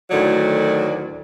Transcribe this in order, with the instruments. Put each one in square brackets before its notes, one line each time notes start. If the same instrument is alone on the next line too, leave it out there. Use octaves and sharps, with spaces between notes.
[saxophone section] D2 A2 D#3 F#3 D5